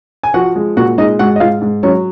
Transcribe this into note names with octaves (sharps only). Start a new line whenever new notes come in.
G#5
F3 F#4 F#5
G#3
A#2 F#4 F#5
G#3 D#4 D#5
G#2 F#4 F#5
D#5
G#2 F4 F5
G#2
F#3 C#4 C#5